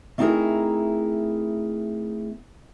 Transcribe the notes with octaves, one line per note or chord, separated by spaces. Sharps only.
A3 C4 D#4 E4 G#4 A#4